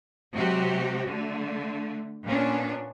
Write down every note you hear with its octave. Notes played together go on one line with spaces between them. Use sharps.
C3 F#3 G#3 F#4 G4
D3 A3
A#2 B3 C#4 D4